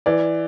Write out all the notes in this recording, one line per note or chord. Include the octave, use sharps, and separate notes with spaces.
E3 D5